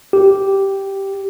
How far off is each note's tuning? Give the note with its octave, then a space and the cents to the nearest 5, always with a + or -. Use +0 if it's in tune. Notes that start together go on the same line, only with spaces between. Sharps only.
G4 -5